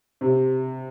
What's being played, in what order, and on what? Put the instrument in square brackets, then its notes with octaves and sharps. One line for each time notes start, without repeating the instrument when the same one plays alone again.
[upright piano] C3